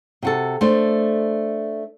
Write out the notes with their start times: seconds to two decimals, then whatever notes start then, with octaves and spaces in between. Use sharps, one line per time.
0.22 C3 F#4 A4
0.61 A3 D4 C5